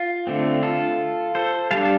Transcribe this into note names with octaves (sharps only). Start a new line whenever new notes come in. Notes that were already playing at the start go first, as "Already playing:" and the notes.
Already playing: F4
D3 A3 C4
F4 A4
A4 C5
G3 D4 F5 A5